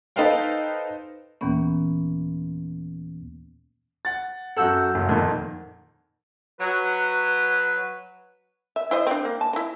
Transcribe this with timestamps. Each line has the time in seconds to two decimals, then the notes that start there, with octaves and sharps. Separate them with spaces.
0.16 D#4 A4 B4 C5 F5 G5
1.41 D#2 A#2 E3 A#3 B3 C#4
4.05 F#5 A6
4.57 F#2 F#4 A4 F#5 E6 G6
4.95 F#1
5.09 F2 A#2 D#3
6.60 F#3 B4
8.76 E5
8.91 E4 C5 D#5
9.07 C4 D4
9.25 A#3
9.41 A5
9.53 D#4 E4